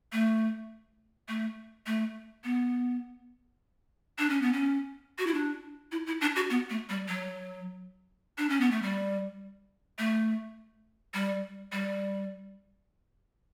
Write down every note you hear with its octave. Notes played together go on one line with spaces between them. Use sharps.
A3
A3
A3
B3
D4
C#4
B3
C#4
F#4
E4
D4
E4
E4
D4
F#4
B3
A3
G3
F#3
D4
C#4
B3
A3
G3
A3
G3
G3